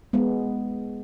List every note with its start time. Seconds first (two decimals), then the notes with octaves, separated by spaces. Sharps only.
0.13 G#3 B3